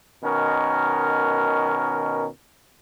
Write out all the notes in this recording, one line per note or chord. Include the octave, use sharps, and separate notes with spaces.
B2 D#3 C#4 A#4